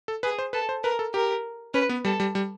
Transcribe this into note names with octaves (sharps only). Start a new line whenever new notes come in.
A4
G#4 B4
C5
A4 B4
C5
A#4 B4
A4
G4 A#4
C#4 B4
B3
G3 A4
G3
G3